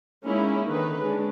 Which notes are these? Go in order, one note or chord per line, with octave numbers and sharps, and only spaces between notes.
G#3 A#3 C#4 D#4 E4
D3 D#3 D#4 B4
G#3 C#4 D4